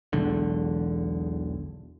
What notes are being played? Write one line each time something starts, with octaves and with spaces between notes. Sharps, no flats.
E1 B1 E2 D3